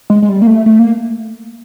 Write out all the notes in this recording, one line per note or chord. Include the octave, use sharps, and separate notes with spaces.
G#3
G#3
G3
A#3
A3
A3
A#3